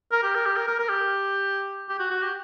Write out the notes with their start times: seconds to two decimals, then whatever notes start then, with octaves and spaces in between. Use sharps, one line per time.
0.12 A#4
0.23 G4
0.35 A#4
0.46 G4
0.56 A#4
0.67 A#4
0.79 A#4
0.89 G4
1.89 G4
1.99 F#4
2.10 F#4
2.22 G4